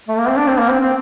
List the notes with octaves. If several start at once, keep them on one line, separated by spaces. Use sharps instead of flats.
A3
A#3
C4
D4
C4
A#3
C4
C4